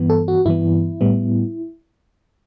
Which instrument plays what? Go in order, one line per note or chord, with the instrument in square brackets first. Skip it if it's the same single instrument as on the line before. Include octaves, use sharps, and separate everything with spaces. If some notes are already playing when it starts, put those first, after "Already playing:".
Already playing: [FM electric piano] G2 E3 B3
A4
F#4
G2 E3 B3 E4
A2 G3 B3